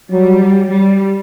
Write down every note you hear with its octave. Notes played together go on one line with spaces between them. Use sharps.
F#3 G3
G3